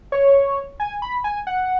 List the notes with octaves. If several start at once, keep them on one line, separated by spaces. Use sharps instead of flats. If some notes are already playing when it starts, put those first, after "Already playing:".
C#5
G#5
B5
G#5
F#5